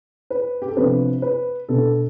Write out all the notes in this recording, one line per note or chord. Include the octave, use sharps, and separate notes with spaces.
B4
G4
A4
C3 F3 B3 D4 B4
B4
B2 B3 D4 A4